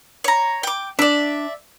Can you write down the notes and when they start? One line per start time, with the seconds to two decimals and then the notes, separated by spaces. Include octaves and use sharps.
0.24 C#5 A#5
0.63 G5 D6
0.99 D4 D5 E5